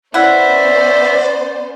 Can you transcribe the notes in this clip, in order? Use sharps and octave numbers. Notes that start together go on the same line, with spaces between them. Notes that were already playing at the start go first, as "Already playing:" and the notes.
B3 C#4 E4 C5 D5 E5 F#5